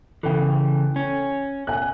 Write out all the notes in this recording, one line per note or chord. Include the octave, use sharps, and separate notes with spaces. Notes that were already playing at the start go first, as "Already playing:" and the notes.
C#3 E3 A4 G5
C#4
G#5 F#6